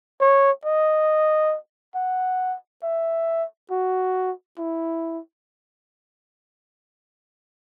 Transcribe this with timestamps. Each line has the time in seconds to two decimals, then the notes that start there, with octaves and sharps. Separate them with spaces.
0.21 C#5
0.65 D#5
1.95 F#5
2.83 E5
3.71 F#4
4.58 E4